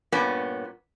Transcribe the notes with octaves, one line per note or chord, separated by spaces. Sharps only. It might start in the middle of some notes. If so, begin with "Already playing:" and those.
G2 A#2 B3 C#4